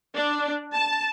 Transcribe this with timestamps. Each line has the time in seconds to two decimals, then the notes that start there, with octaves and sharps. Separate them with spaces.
0.15 D4
0.74 A5